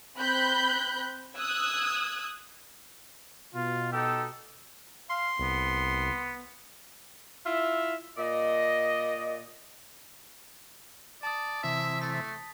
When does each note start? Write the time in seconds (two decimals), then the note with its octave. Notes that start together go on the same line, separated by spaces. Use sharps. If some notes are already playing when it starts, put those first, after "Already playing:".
0.18 C4 B5 F#6 G6
1.37 D#6 E6 F#6 G#6
3.55 B2 F4
3.93 D#4 G4 A4 E6
5.10 F5 C6
5.39 C2 B3
7.45 E4 F4 E5
8.18 A#2 D5 D#5
11.23 D5 A5 D#6
11.64 C3 E3 E5
12.02 A3 A6 B6